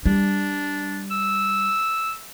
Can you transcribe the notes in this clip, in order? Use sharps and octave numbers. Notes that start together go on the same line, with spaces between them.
G3 D4
E6